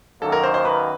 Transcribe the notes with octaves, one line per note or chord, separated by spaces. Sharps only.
F#2 D#3 F#3 A#3 A4
A#4
C5
C5
B4